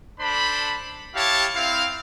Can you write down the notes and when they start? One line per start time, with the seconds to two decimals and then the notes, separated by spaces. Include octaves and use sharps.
0.20 D4 A4 C5 B5
1.15 E4 G4 C#5 F5 A5
1.55 C4 E4 F5